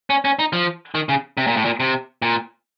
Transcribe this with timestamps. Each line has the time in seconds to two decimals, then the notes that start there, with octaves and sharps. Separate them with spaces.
0.10 C#4
0.25 C#4
0.39 D#4
0.53 F3
0.95 D#3
1.09 C#3
1.38 C3
1.47 A#2
1.57 A2
1.65 A#2
1.80 C3
2.22 A#2